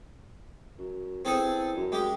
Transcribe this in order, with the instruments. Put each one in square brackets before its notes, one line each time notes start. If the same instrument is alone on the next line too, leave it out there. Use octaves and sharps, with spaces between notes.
[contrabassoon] F#2
[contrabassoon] E2 [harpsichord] C4 G#4 A4
[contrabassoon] F#2
[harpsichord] G#3 G4